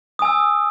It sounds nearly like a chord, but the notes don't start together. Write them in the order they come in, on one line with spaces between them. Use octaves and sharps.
D#6 G#5 E6